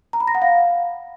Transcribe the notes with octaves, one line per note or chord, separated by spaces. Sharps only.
A#5
B5
A#6
F#5
F5